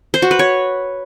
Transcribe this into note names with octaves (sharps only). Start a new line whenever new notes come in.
C5
F#4
B4
C#5